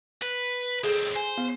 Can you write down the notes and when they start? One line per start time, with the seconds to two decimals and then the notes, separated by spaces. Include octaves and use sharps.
0.22 B4
0.84 D#2 C4 G#4 A4
1.16 C5 G#5
1.38 B3